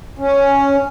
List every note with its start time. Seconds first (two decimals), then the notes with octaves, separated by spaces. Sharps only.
0.18 C#4